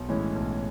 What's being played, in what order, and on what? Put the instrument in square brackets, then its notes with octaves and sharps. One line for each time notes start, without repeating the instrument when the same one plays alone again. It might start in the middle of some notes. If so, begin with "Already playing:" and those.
Already playing: [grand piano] B1
A2 E3 G#3 C#4
B1